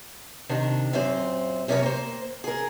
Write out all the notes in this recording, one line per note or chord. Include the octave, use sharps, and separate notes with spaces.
C3 D#3 D4
F#2 A#2 C4 C5
F#2 C3 C#4 G4 A#4 C#5
A#3 C5
G#4 A#4